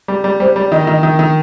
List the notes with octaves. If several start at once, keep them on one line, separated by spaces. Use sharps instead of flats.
G3
G3
G3 C5
G3 D5
D#3 D#5
D#3
D#3
D#3